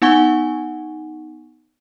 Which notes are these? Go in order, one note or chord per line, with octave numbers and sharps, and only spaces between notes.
B3 D#4 F#5 G#5 C#6 G7